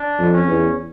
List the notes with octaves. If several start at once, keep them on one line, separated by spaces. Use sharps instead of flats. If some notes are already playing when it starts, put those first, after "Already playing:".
Already playing: D4
F2
C#4
E2